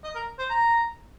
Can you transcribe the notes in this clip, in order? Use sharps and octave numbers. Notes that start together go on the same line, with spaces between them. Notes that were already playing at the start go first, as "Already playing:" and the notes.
D#5
A#4
C5
A#5